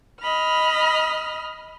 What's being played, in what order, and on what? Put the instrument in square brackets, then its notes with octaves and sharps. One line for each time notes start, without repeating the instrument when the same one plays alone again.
[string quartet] D#5 B5 F6